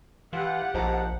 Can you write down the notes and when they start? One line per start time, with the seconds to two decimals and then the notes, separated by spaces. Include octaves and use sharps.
0.33 E3 F4 G4 F#5
0.74 A#1 G#2 F3 A5 A#5